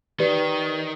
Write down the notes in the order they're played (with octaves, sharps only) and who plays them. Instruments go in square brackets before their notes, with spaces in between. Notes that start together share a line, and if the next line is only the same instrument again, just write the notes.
[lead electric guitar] D#3 [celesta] G4 B4 D5